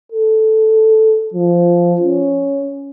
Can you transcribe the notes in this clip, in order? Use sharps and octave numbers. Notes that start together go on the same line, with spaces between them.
A4
F3
C#4